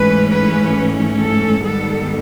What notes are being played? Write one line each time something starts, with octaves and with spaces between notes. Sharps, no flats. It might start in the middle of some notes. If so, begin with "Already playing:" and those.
Already playing: G#2 E3 A3 C#4 B4
B4
A4
G#2 D#3 G3 B3 A4